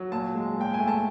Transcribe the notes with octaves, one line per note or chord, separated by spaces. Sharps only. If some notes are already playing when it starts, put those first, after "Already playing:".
Already playing: F#3
A#2 A5
G#3
A#2 G5
G#5
A3
A5